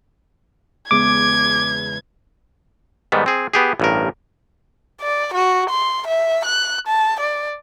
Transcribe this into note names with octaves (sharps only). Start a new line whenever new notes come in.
E2 C#3 G#3 D6 G#6
G#2 D#3 G3 B3
C4 G#4
B3 G4 G#4
A1 G2 A#4
D5
F#4
C6
E5
F#6
A5
D5